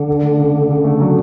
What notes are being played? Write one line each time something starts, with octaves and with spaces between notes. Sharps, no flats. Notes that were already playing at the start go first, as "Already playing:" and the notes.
Already playing: D3
D4
A3
C#3
A3
C#3
A3
F#3